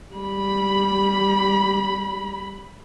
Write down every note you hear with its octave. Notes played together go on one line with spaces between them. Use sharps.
G3 B5